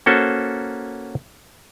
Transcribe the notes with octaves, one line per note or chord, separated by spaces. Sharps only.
A#3 C#4 F#4 A4 C5